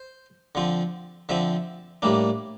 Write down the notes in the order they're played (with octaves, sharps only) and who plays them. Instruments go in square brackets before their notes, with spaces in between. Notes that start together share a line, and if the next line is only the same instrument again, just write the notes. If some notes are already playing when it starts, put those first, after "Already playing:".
Already playing: [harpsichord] C5
D3 F3 C4
D3 F3 C4 E5
A2 G3 A#3 D4